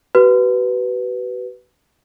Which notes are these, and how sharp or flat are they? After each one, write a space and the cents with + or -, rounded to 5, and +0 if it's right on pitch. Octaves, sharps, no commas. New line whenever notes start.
F#4 +45 B4 +0